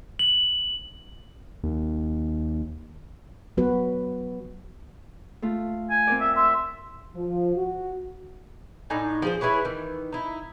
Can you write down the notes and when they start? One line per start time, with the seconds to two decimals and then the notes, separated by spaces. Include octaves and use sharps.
0.19 F#7
1.63 D#2
3.57 F#3 B3 F#4 B4
5.42 A3 F4
5.90 G#5
6.07 C4 A#4 D5
6.21 E5
6.36 E5 C6
7.14 F3
7.56 F#4
8.90 A2 D4 D#4 G#5
9.22 F3 G#4 C5
9.41 E4 G#4 B4 C#5
9.65 D#3 E3
10.12 D#4 E4